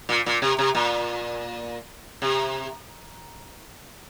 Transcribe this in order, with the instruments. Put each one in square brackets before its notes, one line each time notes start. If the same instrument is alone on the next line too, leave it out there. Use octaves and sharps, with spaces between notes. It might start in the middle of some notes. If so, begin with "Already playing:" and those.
[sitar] A#2
A#2
C3
C3
A#2
C3